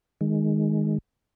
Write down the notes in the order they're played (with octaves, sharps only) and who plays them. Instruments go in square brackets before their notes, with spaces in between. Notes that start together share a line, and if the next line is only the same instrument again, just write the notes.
[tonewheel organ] D#3 G#3